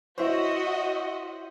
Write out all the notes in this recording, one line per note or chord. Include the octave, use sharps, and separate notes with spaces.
E4 F#4 C5 C#5 D#5 E5